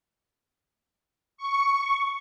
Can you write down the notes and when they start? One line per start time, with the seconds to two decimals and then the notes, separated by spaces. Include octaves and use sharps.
1.37 C#6